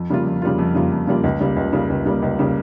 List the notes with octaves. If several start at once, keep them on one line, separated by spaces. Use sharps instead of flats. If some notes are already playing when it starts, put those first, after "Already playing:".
Already playing: F2
C#3 G3 A#3 F4
F2
C#3 G3 A#3 F4
F2
C#3 G3 A#3 F4
F2
C#3 G3 A#3 F4
C#2
C#3 G3 A#3
C#2
C#3 G3 A#3
C#2
C#3 G3 A#3
C#2
C#3 G3 A#3